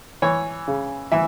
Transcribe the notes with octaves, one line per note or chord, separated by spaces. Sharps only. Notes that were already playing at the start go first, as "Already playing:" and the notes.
E3 C#5
C#3
E3 E5